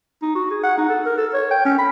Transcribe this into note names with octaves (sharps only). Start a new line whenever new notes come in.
D#4
F#4
G#4
F#5
D#4
A4
A#4
A4
C#5
G5
C#4
B5